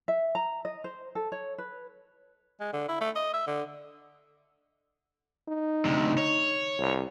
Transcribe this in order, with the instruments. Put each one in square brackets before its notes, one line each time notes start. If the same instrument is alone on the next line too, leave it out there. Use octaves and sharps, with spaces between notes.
[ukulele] E5
A#5
D#5
C5
A4
C#5
B4
[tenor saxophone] G#3
D3
E4
A3
D#5
E5
D3
[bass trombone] D#4
[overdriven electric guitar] D2 C3
C#5
[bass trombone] C2